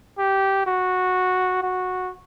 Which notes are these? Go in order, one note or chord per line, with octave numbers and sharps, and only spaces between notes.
G4
F#4
F#4